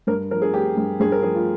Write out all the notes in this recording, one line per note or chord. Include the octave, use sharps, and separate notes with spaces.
G2 A#4
F3 A#4
G#4
C4 G4
G2
G2 G#4
A#4
F3 G#4
F4